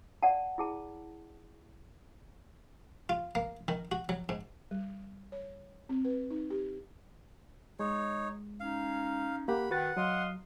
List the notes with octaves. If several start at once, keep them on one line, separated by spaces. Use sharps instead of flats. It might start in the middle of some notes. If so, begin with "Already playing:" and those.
D5 F#5 A5
E4 G#4 A5
F4
A#3
D#3
F#4
F#3
G#2
G3
C#5
C4
B4
D#4
G4
G#3 D#4 C#5
C#4 D#4 F5
A#3 G4 F#5 B5
D#3 F#4 B4 F#5 A6
F#3 D#5 F5 C6